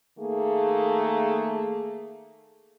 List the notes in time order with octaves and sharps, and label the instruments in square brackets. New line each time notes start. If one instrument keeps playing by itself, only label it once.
[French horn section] D#3 A3 A#3 G#4